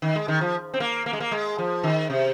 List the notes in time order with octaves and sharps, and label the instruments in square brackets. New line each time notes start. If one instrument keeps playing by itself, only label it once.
[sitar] D#3
G#3
D#3
F3
C4
A#3
A#3
G#3
A#3
G#3
F3
D#3
C3